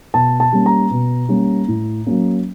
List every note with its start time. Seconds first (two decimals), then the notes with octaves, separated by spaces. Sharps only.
0.14 B2 A5
0.40 A5
0.53 G3 A#3 C#4
0.66 A#5
0.91 B2
1.29 G3 A#3 C#4
1.68 A2
2.06 F#3 A#3 C#4